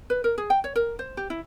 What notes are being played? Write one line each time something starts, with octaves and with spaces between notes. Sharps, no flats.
B4
A#4
G#4
G5
C#5
A#4
C5
G4
E4